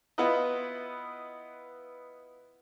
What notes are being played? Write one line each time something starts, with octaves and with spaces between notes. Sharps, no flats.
B3 E4 F4 B4 D#5